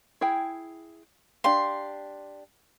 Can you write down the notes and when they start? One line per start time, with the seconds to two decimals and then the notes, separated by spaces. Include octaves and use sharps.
0.21 E4 G#4 G5
1.44 D4 G4 F5 C6